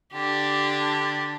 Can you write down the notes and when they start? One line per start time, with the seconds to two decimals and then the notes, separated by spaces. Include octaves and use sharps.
0.13 D3 D4 G4